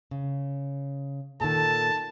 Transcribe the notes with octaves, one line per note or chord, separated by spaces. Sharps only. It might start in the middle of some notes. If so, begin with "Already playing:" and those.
C#3
A#2 D#3 A4 A5